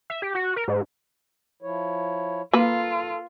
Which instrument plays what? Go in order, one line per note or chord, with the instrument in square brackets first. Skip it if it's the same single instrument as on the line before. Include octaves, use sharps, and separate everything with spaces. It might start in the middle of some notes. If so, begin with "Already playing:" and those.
[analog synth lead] E5
G4
F#4
A#4
G#2
[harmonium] F3 E4 C#5
[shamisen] A#3 B4 [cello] F4 [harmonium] A4